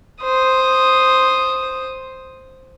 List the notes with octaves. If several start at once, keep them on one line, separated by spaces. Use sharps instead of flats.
C5 D#6